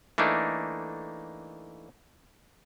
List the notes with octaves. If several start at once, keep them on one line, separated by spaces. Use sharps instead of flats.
E3 A3 A#3 D4 D#4